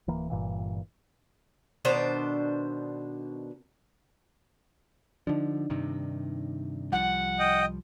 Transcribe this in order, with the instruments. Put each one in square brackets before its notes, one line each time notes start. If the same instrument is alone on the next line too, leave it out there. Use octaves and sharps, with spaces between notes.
[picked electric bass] D1 E3 A#3
G1 G2 A#2 E3
[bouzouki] B2 D#3 D4 C5
[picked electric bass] D3 F3 [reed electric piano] D4 D#4
[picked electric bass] G2 C3 D#3
[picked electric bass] C2 F3 G3 [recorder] F#5
[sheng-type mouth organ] D#5 G5